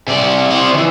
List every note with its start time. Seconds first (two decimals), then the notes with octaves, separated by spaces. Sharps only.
0.08 C3 D5
0.50 C5 D5
0.74 D#3 E3